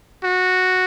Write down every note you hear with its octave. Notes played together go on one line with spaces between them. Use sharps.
F#4